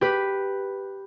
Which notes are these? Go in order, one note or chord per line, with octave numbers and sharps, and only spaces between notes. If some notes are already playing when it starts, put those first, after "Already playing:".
G4 B4